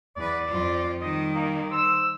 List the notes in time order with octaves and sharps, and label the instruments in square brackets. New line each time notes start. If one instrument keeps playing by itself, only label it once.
[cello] E2 B4 [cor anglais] D5
[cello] F2 F4
[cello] D#3 G3 [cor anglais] D#5
[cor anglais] A#3
[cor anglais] C5 [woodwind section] E6